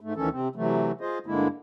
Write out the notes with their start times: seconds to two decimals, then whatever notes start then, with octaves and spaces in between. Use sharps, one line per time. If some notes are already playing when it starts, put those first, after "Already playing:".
0.01 G#2 A3
0.16 D2 D#3 E3 C#4 A4
0.32 C3 C4
0.56 C3 E3 F#3 A3
1.01 F4 G#4 C5 D#5
1.26 G2 D3 G#3 A#3 E4